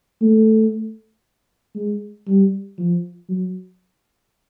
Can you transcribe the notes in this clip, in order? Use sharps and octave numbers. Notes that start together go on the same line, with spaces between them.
A3
G#3
G3
F3
F#3